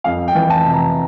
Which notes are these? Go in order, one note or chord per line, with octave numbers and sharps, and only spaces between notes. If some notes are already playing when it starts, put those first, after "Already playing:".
F2 F5
G5
E3
A5
C3
A#5